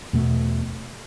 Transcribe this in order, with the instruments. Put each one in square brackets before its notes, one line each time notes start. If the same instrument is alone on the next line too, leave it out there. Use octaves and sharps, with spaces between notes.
[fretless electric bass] E2 B2 A3